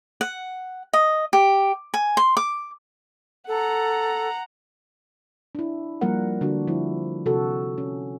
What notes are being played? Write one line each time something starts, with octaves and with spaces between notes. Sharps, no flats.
F#5
D#5
G4
G#5
C6
D6
A4 F#5 A#5
D4 E4
F3 G3 A#3 A#4 F#5
D3 D4 F#4
F3 E4
C3 F#4 A4
C#4